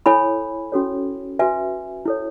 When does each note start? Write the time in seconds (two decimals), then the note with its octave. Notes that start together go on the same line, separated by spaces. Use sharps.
0.06 E4 A4 C#5 G#5 B5
0.72 C#4 F#4 A4 C#5
1.39 F#4 B4 E5 G#5
2.06 E4 A4 C#5